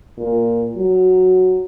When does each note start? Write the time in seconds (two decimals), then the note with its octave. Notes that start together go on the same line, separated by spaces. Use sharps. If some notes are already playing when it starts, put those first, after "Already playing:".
0.18 A#2
0.76 F#3